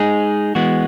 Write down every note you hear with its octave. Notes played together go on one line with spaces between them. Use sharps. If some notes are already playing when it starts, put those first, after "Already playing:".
Already playing: G#3 D#4 G#4
E3 G#3 B3 F#4